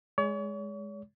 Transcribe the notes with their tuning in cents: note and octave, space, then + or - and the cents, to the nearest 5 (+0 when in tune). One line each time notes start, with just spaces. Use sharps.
G#3 +0 C#5 +40